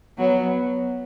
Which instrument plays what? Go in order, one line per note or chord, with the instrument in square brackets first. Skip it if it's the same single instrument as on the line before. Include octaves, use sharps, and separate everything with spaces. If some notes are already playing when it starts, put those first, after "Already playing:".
[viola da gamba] F#3 B3